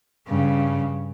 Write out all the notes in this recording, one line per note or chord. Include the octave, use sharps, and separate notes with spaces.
G2 C#3